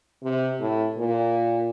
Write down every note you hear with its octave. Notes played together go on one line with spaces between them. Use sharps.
C3
A2
A#2